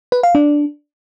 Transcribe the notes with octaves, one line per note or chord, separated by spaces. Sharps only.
B4
F5
D4